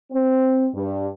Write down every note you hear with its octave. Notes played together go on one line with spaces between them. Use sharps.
C4
G2